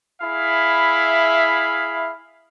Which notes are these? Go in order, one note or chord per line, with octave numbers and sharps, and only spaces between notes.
E4 G#4 E5 F5 B5